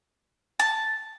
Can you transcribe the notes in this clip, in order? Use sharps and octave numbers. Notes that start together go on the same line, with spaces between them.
A5